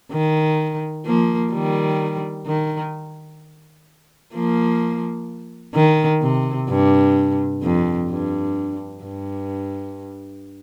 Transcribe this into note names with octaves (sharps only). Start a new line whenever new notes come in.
D#3
F3 A#3
D#3 G3
D#3
F3 A#3
D#3
C3
G2
F2
G2
G2